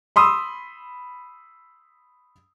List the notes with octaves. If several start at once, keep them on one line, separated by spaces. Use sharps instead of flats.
B5 C6 D#6 E6